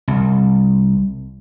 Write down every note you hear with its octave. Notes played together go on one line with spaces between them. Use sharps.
C2